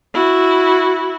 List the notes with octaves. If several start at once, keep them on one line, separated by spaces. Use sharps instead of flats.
E4 F#4